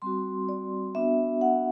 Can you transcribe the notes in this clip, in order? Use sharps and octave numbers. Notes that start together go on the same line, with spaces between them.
G3 C4 F#4 C6
D5
B3 D4 F#4 E5
F#5